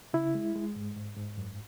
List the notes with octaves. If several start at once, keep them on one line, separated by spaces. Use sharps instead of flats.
C#3 E4
G#3
G#3
G#2
G#2
G#2
F#2